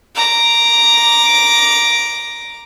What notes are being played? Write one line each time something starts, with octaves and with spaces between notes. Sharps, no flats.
A#5 D6